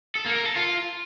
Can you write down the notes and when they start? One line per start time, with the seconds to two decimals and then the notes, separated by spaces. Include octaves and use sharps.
0.15 A4
0.26 A#3
0.36 A#4
0.46 A4
0.56 F4